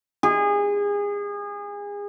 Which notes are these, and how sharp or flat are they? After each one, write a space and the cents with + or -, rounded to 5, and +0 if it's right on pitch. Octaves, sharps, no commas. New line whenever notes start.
G#4 -30